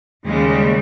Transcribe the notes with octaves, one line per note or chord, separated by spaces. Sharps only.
D#2 C#3 G3 G#3